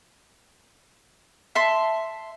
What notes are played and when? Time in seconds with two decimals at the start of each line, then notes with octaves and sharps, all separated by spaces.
1.55 E5 A5 C6